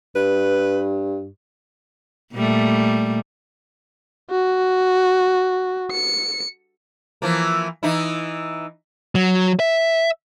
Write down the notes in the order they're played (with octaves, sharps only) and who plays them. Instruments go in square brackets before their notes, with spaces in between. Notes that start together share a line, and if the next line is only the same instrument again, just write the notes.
[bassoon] G2 [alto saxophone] B4
[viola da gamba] A#2 G3 A3
[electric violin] F#4
C#7
[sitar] E3 F3 A#3
E3 D#4 E4
[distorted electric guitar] F#3
E5